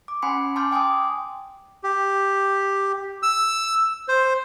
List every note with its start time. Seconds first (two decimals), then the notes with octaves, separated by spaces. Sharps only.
0.08 D6
0.22 C#4 F#5 G#5 B5 C6 C#7
0.56 A5 C6 D6 F6 G6
0.71 G5 G#5 C6 D6 D#6
1.84 G4
3.23 E6
4.08 C5